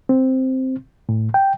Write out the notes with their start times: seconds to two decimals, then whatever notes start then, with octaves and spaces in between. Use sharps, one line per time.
0.09 C4
1.09 A2
1.34 G5